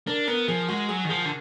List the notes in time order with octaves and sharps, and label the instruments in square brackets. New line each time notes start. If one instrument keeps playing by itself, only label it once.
[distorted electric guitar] D4 [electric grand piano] A#4
[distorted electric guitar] B3 [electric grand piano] A#4
[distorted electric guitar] F3 [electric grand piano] G#4
[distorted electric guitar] G#3 [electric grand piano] F#4
[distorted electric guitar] F#3 [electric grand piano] G#4
[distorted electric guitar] D#3
[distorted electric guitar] F3 [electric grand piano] G#4
[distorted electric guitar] D3